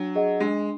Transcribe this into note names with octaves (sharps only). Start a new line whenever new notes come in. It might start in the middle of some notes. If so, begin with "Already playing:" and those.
Already playing: F#3 D4
G#4 D#5 F#5
G#3 D4